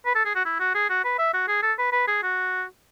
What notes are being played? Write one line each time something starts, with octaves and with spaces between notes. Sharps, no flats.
B4
A4
G#4
F#4
E4
F#4
G#4
F#4
B4
E5
F#4
G#4
A4
B4
B4
G#4
F#4